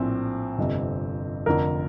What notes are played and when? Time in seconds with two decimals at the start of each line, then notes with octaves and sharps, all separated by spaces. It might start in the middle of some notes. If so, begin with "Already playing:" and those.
Already playing: A#1 A2 C4
0.58 G1 F2 C3
1.46 F1 F2 D3 A#4